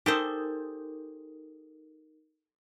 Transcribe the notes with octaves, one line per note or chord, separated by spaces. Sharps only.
D#4 G4 A4 A#4 C5 D#6